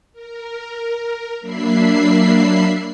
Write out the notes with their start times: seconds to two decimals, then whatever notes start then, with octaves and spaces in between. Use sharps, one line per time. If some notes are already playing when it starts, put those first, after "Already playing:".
0.13 A#4
1.41 F#3 A#3 D4 E5 B5 C7